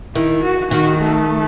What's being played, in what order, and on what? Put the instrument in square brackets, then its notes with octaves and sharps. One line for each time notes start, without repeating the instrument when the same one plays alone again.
[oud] D#3 [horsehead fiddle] E4
[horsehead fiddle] F#4
[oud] D#3 [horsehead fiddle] F#4
[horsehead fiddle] A3